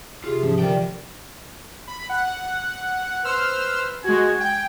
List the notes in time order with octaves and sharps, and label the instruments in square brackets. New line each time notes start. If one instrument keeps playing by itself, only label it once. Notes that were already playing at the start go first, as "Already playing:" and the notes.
[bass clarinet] C3 [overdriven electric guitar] F4 [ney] G#4
[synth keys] G#2 C#4 [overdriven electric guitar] F3
[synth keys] D3 F3 D5 [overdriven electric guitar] D#3 G5 [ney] A#4
[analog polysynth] B5
F#5
[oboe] B4 [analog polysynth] C5 E6 F6
[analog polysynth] G#3 F#4 [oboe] G#5
[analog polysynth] G5